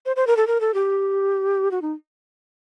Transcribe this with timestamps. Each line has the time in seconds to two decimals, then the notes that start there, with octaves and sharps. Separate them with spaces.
0.06 C5
0.16 C5
0.27 A#4
0.37 A4
0.47 A#4
0.61 A4
0.74 G4
1.71 F#4
1.82 D#4